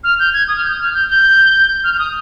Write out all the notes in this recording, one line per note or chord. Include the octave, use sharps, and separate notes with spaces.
F6
G6
G#6
D#6
F6
G6
F6
G6
G6
F6
F6
D#6